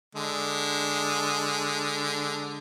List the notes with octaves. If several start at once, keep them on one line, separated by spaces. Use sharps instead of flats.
D3 G#3